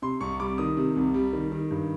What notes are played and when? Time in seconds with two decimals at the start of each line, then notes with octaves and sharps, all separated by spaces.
0.02 C3 C6
0.20 C2 C#6
0.40 G3 D6
0.58 D#3 D#6
0.77 C3
0.96 C2
1.14 G3
1.33 D#3
1.52 D#3
1.71 G2